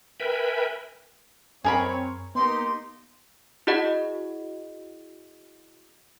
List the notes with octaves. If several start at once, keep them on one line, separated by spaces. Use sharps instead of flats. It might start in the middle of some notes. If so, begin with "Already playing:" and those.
A#4 B4 E5 G5 G#5 B5
F#2 C4 G#4 A#4 C#5 B5
A#3 B3 D#4 G4 C6
E4 F#4 G#4 D#5 F#5